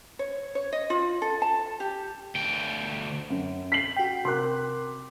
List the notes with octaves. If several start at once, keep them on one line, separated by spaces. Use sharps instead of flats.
C#5
C#5
D#5
F4
A4
A5
G4
D2 G5
F#2
B6 C7 F#7
F#4 G5
C3 A#4 C6 D6 F#6